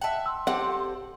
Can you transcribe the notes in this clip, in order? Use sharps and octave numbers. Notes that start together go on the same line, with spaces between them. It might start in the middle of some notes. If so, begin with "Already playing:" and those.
D#5 E5 F#5 G5 A5
C6 E6
C4 G4 A4 F#5